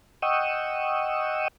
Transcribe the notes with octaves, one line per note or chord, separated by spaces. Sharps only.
D#5 F#5 G5 C#6 D#6 E6